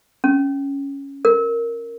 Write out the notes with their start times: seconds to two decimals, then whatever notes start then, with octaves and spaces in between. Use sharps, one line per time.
0.24 C#4
1.25 A#4